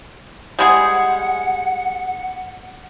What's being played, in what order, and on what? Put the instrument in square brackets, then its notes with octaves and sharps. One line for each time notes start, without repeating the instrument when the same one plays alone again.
[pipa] G3 G#3 G#4 [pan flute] F#5